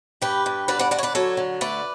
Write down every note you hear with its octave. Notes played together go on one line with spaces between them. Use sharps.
G2 G4 B4
G2
D3 B4 D5
D5 F#5
D3 D5 F#5
C#5
B4 D5
F#3 A4 C#5
D3
A3 B4 D5